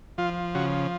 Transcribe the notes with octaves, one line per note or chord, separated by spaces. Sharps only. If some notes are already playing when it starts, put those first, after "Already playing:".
F3 F4
C#3 F#4